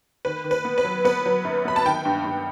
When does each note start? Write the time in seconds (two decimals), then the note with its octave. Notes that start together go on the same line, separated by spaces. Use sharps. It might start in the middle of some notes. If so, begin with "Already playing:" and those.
0.25 D#3 B4
0.44 D#3
0.51 B4
0.65 B3
0.78 B4
0.84 F#3
1.05 B3 B4
1.26 F#3
1.45 F#2
1.65 B3 B5
1.76 A5
1.85 D#3 G5
2.05 G2
2.25 G2